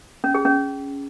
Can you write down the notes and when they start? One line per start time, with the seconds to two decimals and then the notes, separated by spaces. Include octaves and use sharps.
0.24 C#4
0.35 G#4
0.45 C#4